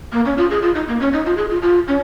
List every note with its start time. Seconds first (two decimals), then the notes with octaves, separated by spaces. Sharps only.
0.12 A#3
0.25 C#4
0.37 F4
0.50 G#4
0.62 F4
0.75 D#4
0.88 A#3
1.00 C#4
1.13 D#4
1.26 F4
1.37 G#4
1.50 F4
1.62 F4
1.88 C#4